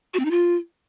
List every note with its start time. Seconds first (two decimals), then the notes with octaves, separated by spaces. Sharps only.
0.14 F#4
0.19 C4
0.25 D#4
0.31 F4